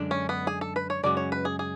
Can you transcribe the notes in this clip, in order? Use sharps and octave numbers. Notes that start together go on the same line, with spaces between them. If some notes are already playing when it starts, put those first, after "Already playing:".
Already playing: F#2 D3 G#3 D4
C#4
B3
G#4
A4
B4
C#5
F#2 C#3 G#3 C#4 F#4 D5
C#5
B4
G#4
G#4